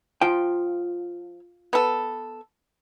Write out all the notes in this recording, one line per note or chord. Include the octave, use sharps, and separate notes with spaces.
F3 F4 G5
B3 A4